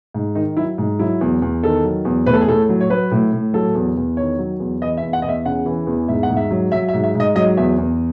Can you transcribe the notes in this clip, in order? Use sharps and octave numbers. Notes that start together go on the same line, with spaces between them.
G#2
D#3 D#4
F#3 E4
G#2
F#3 E4
E2
E2
D#3 A4
F#3
E2
A2 B4
A4
G#4
A2 A4
F#3
C#5
F#3 B4
A2
A2
F#3 A4
E2
E2
D#3 C#5
F#3
E2
E3 D#5
E5
E2
F#5
E2 D#5
E5
C#3 F#5
E3
E2
G#2 E5
F#5
G#2
E5
F#3
F#3 E5
E5
G#2
E5
G#2 D#5
F#3 D#5
E2 E5
E2